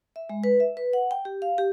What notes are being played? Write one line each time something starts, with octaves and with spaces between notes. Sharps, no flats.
E5
G#3
B4
E5
B4
F#5
G5
G4
F5
G4